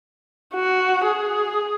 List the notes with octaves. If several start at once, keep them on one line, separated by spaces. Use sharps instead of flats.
F#4
G#4